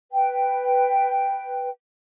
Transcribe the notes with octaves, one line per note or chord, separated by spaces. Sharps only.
B4 G5